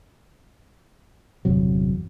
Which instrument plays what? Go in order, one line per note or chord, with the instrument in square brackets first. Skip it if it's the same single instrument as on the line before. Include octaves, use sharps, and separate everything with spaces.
[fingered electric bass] G1 E2 C3 F#3